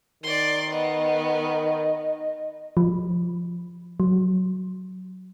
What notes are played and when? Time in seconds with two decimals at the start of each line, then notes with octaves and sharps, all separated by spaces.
0.23 D#3 D5 C6
0.71 B3 D#5
2.77 F3
4.00 F#3